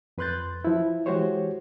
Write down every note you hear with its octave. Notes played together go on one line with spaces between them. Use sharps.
F2 B4 C6 F#6 G6 A6
F3 E4
E3 G#3 F#4 G4 C5 C#5